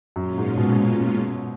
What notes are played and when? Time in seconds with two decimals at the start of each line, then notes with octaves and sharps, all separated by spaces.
0.16 F#2 A#2 G#3 C#4 F4
0.38 G#2
0.58 B2